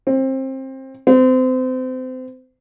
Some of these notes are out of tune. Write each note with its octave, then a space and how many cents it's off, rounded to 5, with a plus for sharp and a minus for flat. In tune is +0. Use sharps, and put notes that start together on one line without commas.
C4 +25
C4 -30